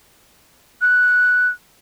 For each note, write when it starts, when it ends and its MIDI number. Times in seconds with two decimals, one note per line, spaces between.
0.82 1.49 90